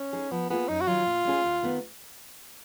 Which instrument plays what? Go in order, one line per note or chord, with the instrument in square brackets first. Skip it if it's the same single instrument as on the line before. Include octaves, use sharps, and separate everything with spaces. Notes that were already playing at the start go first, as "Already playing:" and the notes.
Already playing: [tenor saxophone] C#4
[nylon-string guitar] G#3 D#4 G#4
[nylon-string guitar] F3 [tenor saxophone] B3
[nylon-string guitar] A#3 F4 G#4 [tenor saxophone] B3
[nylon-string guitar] F#2 [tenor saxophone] D#4
[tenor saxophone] F#4
[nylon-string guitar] D#3 F#3 [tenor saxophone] F4
[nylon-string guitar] A#2
G#3 C#4 G#4
D#2
D#3 G#3 B3